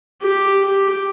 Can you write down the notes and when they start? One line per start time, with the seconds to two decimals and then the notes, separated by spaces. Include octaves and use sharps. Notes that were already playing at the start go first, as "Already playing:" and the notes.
0.22 G4
0.62 G4